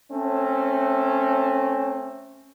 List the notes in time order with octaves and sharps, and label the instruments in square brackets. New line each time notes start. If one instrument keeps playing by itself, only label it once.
[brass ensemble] A3 C4 C#4